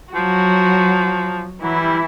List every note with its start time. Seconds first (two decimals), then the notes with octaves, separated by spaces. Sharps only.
0.14 F3 F#3 F#4
1.62 E3 F#3 E4
1.80 G3